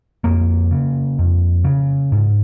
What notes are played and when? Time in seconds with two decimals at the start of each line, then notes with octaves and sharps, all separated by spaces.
0.24 F2 A#3
0.71 C#3
1.19 F2
1.64 C#3
2.12 G#2